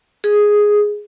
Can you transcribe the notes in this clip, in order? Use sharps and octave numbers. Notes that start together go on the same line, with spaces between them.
G#4